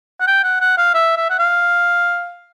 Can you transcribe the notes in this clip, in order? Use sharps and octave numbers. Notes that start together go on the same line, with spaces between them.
F#5
G5
F#5
F#5
F5
E5
E5
F#5
F5